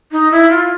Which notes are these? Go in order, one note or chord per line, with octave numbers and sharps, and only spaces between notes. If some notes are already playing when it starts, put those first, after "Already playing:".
D#4
E4
F4